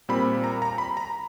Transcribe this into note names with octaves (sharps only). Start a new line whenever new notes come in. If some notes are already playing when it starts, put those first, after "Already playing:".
A#2 G3 C4 B5
A#5
A#5
B5
A#5